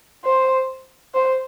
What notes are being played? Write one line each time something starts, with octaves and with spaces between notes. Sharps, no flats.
C5
C5